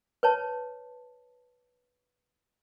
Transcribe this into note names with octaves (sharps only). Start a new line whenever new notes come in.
B4 C#5 A5